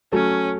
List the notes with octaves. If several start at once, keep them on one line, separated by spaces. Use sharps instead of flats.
F#3 A3 C#4